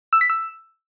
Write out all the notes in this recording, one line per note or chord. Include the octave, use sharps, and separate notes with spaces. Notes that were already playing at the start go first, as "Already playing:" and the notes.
E6
B6
E6